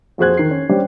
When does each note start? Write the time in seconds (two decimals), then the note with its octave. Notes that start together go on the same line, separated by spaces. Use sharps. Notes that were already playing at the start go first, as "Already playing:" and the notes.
0.18 F2 F#4 G#4 C5 F#6 G#6
0.37 D#3 C7
0.51 C#4
0.69 G3 C#4 D4 G4 C5